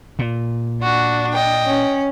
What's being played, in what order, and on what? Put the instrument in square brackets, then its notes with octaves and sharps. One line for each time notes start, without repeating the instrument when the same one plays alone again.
[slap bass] A#2
[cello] D4 [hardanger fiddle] F#4
[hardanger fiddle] D#5 G5
[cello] C#4